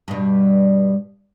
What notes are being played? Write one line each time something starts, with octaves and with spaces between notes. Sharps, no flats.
G2 B2